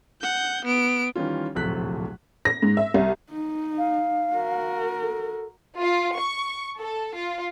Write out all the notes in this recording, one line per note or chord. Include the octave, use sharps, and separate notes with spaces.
F#5 G6
B3 D7
D#3 E3 G3 C#4 F4
D1 A#1 C3 A3 F#6 B6
A#6
G#2
E5
C2
D#4
F5
F#4 A#4
A4
F4
C#6
A4
F4